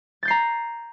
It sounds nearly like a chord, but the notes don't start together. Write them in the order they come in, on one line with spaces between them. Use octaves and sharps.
A6 G6 C7 A#5